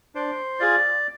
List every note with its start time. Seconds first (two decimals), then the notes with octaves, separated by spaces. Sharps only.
0.15 D4 C5
0.60 F4 G#4 D5